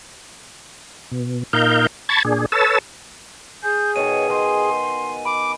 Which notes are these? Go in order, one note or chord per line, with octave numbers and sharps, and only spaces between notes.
B2
A#2 D#4 A#4 F5 G6
A5 B5 C#6 G#6 A6
A#2 D4 G#4
A4 B4 C#5 A5 E6
G#4 G6
B2 D#3 C#5 D#7
F#4 G#5 C6
B5 D6